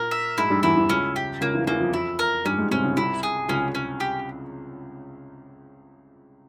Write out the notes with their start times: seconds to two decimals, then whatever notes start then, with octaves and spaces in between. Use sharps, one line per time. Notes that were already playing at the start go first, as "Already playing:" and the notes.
Already playing: A#2 A#3 A#4
0.11 E5
0.37 G#2 G#3 E4
0.50 G2 G3
0.63 E2 E3 E4
0.77 E2 E3
0.89 C#2 C#3 C#4
1.16 G4
1.41 C#2 C#3 A#3
1.54 E2 E3
1.67 E2 E3 A#3
1.80 F2 F3
1.93 F2 F3 E4
2.19 A#4
2.45 G2 G3 C#4
2.58 G#2 G#3
2.71 C3 C4 C#4
2.83 C#2 C#3
2.97 C2 C3 E4
3.23 G#4
3.48 C#2 C#3 C#4
3.75 C#4
4.00 G4